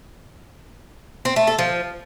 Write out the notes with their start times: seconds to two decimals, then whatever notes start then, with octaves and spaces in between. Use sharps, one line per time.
1.25 C4
1.36 A3
1.47 A4
1.59 F3